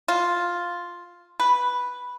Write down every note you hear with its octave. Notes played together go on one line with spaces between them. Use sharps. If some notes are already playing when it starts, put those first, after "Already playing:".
F4
B4